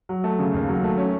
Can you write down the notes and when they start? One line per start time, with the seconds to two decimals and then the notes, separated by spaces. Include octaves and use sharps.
0.09 F#3
0.24 A3
0.39 C#3
0.54 D#2
0.69 F#3
0.83 A3
0.98 C#4